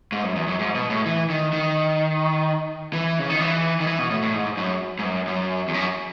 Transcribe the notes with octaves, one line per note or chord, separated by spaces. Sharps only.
G#2
F#2
E2
F#2
G#2
B2
A2
E3
D#3
D#3
E3
C#3
D#3
E3
D#3
E3
B2
A2
A2
G#2
F#2
G#2
F#2
F#2
E2
F#2